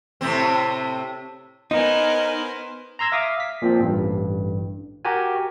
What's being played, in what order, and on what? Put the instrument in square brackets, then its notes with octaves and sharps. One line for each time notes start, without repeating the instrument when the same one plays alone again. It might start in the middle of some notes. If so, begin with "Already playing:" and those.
[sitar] A2 C3 C4
[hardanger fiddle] B3 C5 [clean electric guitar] D#4 [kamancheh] A#4 G#5
[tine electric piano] A#5 C6 E6 G#6 A#6
E5 F5 D6 D#6
B6
A#2 F3 C4
A1 G2
F#4 G4 A#4 G#5